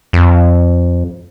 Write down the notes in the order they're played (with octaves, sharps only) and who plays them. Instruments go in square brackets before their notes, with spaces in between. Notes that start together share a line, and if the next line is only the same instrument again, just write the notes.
[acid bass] F2